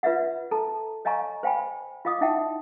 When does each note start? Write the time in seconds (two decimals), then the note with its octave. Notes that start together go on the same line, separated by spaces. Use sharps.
0.03 F4 B4 D5 E5 F#5
0.51 A4 A5 A#5
1.05 C#5 D#5 F5 G#5 A#5 C#6
1.43 C5 F5 G5 G#5 B5
2.05 F4 D#5 F5 D6 D#6
2.21 D#4 E4 E5 F#5 G5 A5